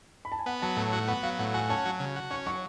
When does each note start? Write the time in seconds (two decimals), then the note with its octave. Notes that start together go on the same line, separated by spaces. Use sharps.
0.25 B5
0.32 A5
0.39 G#5
0.46 B3 F#5
0.62 F#3 A5
0.77 A2 A5
0.92 F#4 F#5
1.08 B3 F#5
1.23 F#3 F5
1.38 A2 F#5
1.54 F#4 G#5
1.69 C#4 A5
1.85 F#3
2.00 C#3
2.16 F#4
2.31 C#4 C#6
2.46 F#3 C#6